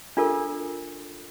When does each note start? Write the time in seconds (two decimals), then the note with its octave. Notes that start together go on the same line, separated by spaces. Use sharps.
0.17 D4 F4 A4 A#4